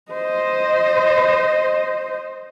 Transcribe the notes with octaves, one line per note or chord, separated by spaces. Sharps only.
C5 D#5